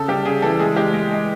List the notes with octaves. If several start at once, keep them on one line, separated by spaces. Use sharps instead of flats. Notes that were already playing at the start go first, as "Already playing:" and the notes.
Already playing: C#3 A4
G3 G4
C#3 G#4
E3 A4
G#3 G#4
G#3 G4
G#3
G#3